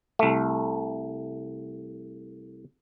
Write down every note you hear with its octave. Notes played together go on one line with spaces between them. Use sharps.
C2 A3